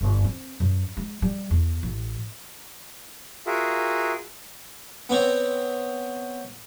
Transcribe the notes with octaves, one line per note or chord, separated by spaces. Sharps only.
G1
C4
F#2
G#3
G3
E2
A1
F4 F#4 G#4 A#4 E5
B3 C4 C#5